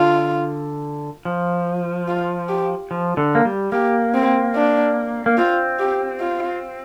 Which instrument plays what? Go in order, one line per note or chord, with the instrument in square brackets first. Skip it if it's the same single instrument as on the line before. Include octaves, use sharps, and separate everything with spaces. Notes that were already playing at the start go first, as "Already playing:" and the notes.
Already playing: [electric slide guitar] D3 [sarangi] F4
[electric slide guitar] F3
[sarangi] F4
G4
[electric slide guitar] F3
D3
A#3
G3
[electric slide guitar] A#3 [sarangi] G4
[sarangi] C4
D4
[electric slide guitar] A#3
[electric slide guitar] C4 [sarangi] F4
[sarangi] G4
F4